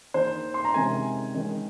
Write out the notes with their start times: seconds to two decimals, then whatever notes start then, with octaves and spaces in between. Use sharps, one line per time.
0.14 D#3 A#3 D#4 C5
0.54 C6
0.65 A#5
0.74 C3 D#3 G#3 C#4 G#5
1.35 D#3 G#3 C#4